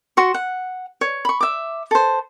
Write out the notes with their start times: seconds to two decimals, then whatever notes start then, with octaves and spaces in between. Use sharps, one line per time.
0.17 F#4 C6 C#6
0.34 F#5
1.01 C#5
1.25 B5 C#6
1.41 E5 D6
1.91 A4 C5